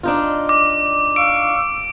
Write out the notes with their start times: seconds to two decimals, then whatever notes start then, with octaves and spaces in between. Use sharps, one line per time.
0.03 D4 D#4 F4
0.49 D6
1.16 F5 C#6 E6 D7